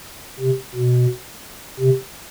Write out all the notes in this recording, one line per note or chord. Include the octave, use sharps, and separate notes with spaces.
C3
B2
C3